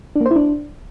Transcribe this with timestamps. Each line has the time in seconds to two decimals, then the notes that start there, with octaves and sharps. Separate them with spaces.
0.16 D4
0.21 A#3
0.26 C5
0.31 E4
0.36 D4